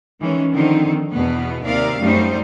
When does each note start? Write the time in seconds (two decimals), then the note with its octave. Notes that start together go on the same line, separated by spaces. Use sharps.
0.19 D#3 E3 G#3 C#4
0.52 D3 D#3 F3 C4 D#4
1.11 E2 B2 B3
1.65 D#2 C3 A#4 D5 E5 F5
2.00 F#2 G3 A3 D#4 C5